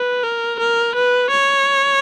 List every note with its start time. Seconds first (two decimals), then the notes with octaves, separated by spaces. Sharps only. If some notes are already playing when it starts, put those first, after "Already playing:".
Already playing: B4
0.23 A#4
0.60 A#4
0.95 B4
1.32 C#5